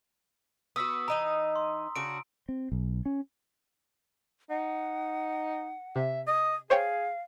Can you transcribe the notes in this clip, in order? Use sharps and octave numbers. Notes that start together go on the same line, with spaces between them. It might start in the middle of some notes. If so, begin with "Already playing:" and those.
B3 F#4 D#6 E6 B6
E3 D#4 D#5 A#5
C6
C#3 D4 F#4 D7
C4
B1
C#4
D#4 F#5
C3 E5
D#5 D#6
G#4 C5 C#5 F5 G5